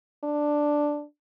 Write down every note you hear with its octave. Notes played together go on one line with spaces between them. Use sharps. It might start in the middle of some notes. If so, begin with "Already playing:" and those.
D4